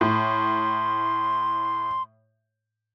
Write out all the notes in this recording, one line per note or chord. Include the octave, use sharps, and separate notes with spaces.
A2 C6